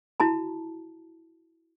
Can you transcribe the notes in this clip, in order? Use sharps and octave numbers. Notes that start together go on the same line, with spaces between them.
E4 F#4 A5 A#5